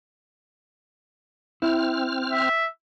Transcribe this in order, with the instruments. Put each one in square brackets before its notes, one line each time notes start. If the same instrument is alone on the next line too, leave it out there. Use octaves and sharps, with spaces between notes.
[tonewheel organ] C4 F6 [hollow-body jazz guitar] E4
[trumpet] E5